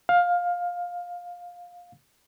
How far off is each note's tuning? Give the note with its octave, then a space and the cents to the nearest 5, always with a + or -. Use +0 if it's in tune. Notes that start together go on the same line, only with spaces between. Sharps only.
F5 +15